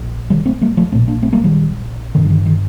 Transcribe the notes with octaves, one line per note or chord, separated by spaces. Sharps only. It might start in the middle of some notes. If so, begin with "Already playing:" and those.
Already playing: A#1
D#3 G3
A3 C4
G3 A#3
F3 A3
A#1 A#2 A3 C4
A#3 D4
A3 C4
G3 A#3
D#3 G3
G1 G2 D3 D#3
F3
D#3
D#3